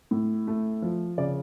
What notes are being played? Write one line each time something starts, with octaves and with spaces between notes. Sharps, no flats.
A2
A3
F3
C#3 D5